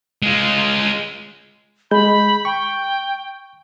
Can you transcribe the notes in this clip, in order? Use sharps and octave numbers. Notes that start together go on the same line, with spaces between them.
G#3 F4
G#3 B5 G6
G5 C#6